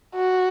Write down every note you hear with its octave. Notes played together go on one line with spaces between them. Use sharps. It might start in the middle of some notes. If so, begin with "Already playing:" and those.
F#4